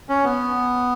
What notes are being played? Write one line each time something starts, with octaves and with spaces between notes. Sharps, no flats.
C#4
B3